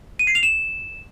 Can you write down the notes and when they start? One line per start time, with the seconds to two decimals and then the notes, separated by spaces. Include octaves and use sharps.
0.19 D#7
0.27 C7
0.35 F7
0.43 E7